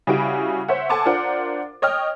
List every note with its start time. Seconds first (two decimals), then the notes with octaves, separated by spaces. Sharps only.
0.07 C#3 G3 E4 F#4 D7
0.68 C5 C#5 E5 F#5
0.90 A4 F#5 G#5 A5 C6 D6
1.06 D4 F4 A#4 C5 F#5
1.82 C#5 D#5 G5 F6